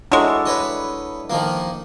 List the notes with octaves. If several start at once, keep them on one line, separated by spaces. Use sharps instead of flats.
F#3 G#3 D4 E4 A4
B4 C#5 D#5
D#3 F3 A#3